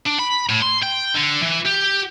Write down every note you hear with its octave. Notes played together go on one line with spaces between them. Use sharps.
D4
B5
A2
C6
G5
D3
E3
G4